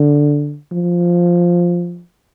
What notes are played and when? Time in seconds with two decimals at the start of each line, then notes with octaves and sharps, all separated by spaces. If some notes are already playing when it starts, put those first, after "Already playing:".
Already playing: D3
0.72 F3